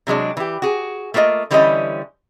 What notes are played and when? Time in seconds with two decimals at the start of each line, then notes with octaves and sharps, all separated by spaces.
0.07 C3 F#3 G#3 D4
0.37 E3 G4
0.62 F#4 G#4
1.14 A3 A#3 F4 C5 D#5
1.51 D3 E3 G3 C#4 E4 D#5